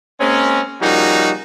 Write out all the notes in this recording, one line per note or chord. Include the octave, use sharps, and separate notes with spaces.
G#3 A#3 C4 C#4
C#3 F3 G3 A#3 D#4 F#4